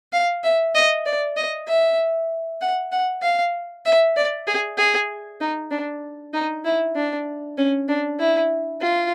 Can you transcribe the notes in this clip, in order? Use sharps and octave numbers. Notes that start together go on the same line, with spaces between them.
F5
E5
D#5
D5
D#5
E5
F#5
F#5
F5
E5
D5
G#4
G#4
D#4
D4
D#4
E4
D4
C#4
D4
E4
F4